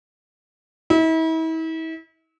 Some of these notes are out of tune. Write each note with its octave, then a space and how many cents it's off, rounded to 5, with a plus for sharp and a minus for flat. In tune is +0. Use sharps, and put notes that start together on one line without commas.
E4 -40